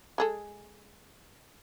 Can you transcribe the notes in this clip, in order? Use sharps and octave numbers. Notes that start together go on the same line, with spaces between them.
G#3 G#4 A4